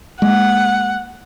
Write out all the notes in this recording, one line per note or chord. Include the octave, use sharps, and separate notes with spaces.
G#3 A#3 F#5